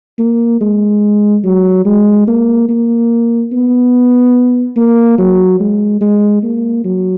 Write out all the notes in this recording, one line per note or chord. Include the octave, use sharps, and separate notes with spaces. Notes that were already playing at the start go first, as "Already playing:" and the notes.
A#3
G#3
F#3
G#3
A#3
A#3
B3
A#3
F#3
G#3
G#3
A#3
F#3